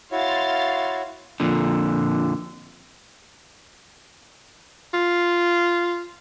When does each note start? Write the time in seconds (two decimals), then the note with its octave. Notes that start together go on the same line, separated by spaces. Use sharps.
0.12 E4 F#4 C#5 F5 C6 A6
1.40 F2 A#2 D3
4.93 F4